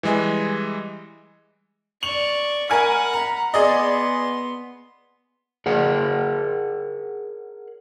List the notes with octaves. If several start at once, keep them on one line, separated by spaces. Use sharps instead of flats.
E3 G3 G#3 D#5 G#5
D5 C#6 F7 F#7
A#4 F#5 G#5 B5 F6
A#5
B3 G#4 D5 D#5 C6
G#4 A#4 C#5 F#5